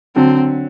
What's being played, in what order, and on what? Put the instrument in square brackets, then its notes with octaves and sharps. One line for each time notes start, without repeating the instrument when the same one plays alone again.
[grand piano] D3 F#3 [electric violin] C4